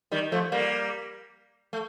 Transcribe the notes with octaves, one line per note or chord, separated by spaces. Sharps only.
D#3 G3
F3 A3
G3 A#3
A3